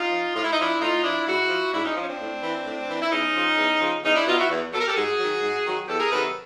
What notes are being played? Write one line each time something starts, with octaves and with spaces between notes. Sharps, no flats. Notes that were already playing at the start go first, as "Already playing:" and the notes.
Already playing: D#4 F4
F3
A2 F4
E4
D#4
F3 D4 E4
A2 D#4 F4
F3 D4 E4
G#2 E4 F#4
F3
G#2 D4 E4
C#4 D#4
F3 C#4
C4 D4
A2
E3
A2
E3
E4
E2 C#4 D#4
C#3 F3
E2
C#3 F3
E2 C#4 D#4
D4 E4
B2 F#3 D#4 F4
E4 F#4
E2
B2 F#3 A4
A#4
G4 A4
G#2 F#4 G#4
D#3 F#3
G#2
D#3 F#3
E2 G4 A4
G#4 A#4
C3 D#3 F#3 A4 B4